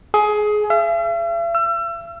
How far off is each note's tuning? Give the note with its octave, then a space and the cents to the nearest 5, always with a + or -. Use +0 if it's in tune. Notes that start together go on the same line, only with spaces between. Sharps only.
G#4 +20
E5 +45
E6 +35